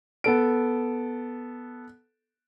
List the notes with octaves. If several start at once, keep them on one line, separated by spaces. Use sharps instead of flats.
B3 A4 D7